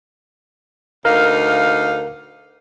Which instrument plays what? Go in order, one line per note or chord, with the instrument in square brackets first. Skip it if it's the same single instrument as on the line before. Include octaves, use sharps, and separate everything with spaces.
[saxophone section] D2 D#4 F5 [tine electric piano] A#4